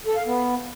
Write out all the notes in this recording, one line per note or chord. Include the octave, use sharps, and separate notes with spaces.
A4
F5
B3